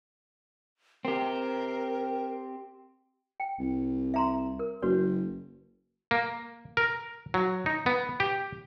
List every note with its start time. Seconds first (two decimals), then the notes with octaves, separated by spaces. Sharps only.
1.05 C4 G4 A#4
3.40 G5
3.59 C2
4.14 E5 A#5 C6
4.59 A#4
4.82 F#1 F#4 B4 C#5
6.11 A#3
6.77 A#4
7.34 F#3
7.66 D#4
7.86 B3
8.20 G4